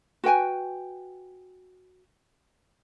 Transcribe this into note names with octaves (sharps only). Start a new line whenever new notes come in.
F#4 B4 G5 G#5